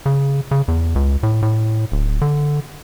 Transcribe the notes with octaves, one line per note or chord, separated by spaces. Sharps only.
C#3
C#3
E2
C#2
A2
A2
D1
D3